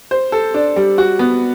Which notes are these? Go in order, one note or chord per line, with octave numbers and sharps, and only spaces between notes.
C5
A4
D4
G3
F#4
B3